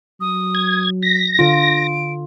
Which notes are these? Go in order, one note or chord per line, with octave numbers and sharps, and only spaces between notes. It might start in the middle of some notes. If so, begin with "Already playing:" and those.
F#3 D#6
G#6
A#6 B6
D3 F4 D7